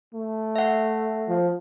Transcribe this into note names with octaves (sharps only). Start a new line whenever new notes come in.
A3
E5 F#5
F3